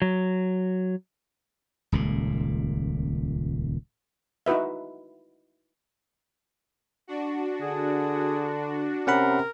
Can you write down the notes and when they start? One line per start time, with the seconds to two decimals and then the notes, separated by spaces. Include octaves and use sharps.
0.02 F#3
1.92 D#1 C#2 A#2
4.46 D#4 E4 F#4 B4 E5
7.07 D4 F#4
7.61 D3 G#4
9.07 C3 C#4 A#4 F#5 B5